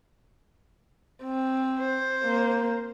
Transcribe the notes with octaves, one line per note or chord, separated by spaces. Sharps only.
C4
C5
A#3